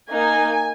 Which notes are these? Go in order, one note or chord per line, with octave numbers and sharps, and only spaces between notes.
A#3 D#4 G#5